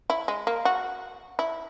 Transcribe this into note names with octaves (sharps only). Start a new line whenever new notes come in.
E4
G#3
A#3
F#4
E4